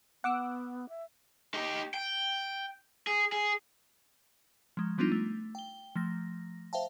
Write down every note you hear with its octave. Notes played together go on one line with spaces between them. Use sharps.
B3 F#5 D6 E6
E5
D#4 G4
G5
G#4
G#4
F3 G#3
F3 G3 B3 D4 D#4 F4
A3
G5 G7
F3 A3 A#6
C5 E5 F5 G5 A5